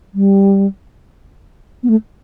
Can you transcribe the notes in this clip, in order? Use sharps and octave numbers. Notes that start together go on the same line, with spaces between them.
G3
B3
A3